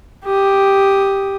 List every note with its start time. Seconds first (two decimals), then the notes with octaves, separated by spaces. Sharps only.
0.25 G4 D#6